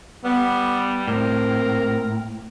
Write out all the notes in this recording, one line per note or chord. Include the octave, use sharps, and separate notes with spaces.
G3 B3
A2 C4 A#4